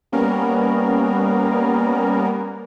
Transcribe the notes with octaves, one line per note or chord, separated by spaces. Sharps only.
G3 A#3 B3 C#4 A#4